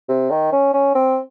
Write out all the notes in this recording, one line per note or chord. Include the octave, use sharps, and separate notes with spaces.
C3
D#3
C#4
C#4
C4